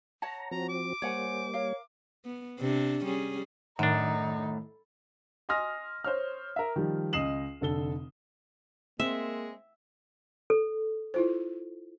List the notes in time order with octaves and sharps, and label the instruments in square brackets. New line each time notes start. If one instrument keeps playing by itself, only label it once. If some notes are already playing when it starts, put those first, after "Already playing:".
[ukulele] C#5 F#5 A5 [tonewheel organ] A#5
[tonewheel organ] F3 C4 [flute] F#4 [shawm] A#5
[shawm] D6
[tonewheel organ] G3 A#3 [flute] C5 [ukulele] C#5 F#5 G#5
[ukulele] A#4 F5 [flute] C#5
[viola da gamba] B3
C3 D4
G3 C#4 G#4
[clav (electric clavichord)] F#2 D4 [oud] A2 [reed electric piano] D#3 [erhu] D#4
[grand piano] D#5 G#5 C6 D#6 F6 A#6
C5 C#5 F6
A#4 E5
D#3 F3 G3
C#2 D#5 D#6 C7 E7 F#7
F1 D3 A4 G7
[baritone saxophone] G#3 [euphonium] A#3 [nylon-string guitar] C4 [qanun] E5
[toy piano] A4
[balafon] E4 F4 C5